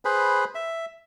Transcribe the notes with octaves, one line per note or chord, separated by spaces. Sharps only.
G#4 B4 C5 B5
E5